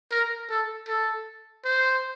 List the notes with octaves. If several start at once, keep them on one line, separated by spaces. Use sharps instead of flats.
A#4
A4
A4
C5